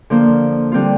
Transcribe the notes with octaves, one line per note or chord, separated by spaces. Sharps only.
D3 F3 A#3
D3 G3 C4 F4